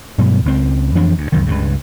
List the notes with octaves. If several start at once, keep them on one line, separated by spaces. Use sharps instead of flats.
G2 B2 F#3
C#2 C4
F2 E3 D4
D2
C#2 F#2 D#3
C#2 G2 C#3